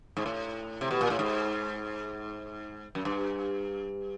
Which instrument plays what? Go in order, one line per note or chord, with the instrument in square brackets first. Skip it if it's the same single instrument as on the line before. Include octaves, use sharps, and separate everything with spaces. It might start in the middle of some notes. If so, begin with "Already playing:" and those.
[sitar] G#2
A2
C3
B2
A#2
A2
G#2
F#2
G2